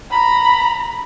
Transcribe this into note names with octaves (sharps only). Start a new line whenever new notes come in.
A#5 B5